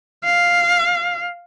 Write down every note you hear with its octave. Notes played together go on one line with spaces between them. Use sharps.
F5